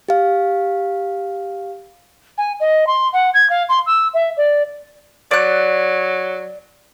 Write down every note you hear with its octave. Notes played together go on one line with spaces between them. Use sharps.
G4 F5
G#5
D#5
C6
F#5
G#6
F5
C6
E6
E5
D5
F#3 D5 F#6